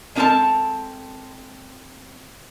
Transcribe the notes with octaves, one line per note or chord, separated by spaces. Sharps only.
G#3 C4 D#4 A4 A#4 A5